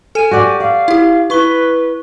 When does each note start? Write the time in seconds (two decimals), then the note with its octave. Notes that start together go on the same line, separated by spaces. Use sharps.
0.15 A4 G#5 D#7
0.31 F#4 G4 D5
0.60 D5 F5
0.88 E4 G4
1.30 E4 B4 C#6 G7